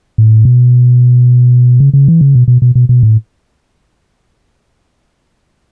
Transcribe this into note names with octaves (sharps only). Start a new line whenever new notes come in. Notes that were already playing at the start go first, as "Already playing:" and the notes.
A2
B2
C#3
C#3
E3
C#3
B2
B2
B2
B2
B2
A2